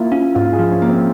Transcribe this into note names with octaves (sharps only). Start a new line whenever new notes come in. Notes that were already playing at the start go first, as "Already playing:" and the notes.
Already playing: A#3 E4 F4
C#4 F4
G#2 F4
G#4
F3
C#4
A#3
C4